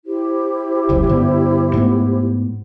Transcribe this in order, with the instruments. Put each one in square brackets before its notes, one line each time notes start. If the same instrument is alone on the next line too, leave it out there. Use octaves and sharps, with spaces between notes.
[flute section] E4 G4 C5
[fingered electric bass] F1 C#2 F#2
G2 D3 B3
G#2 A3 B3